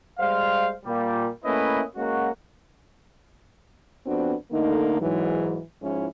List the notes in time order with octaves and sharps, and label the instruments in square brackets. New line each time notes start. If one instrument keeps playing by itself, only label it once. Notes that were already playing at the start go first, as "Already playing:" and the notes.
[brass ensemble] G3 G#3 C5 F5
A#2 G3
A3 A#3 C#4 E4 B4 D#5
G#3 A#3 C#4 F#4
[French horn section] F2 B3 C4 D4 F#4 B4
D3 A3 A#3 D#4
G#2 E3 F#3
G#2 F3 C#4 E4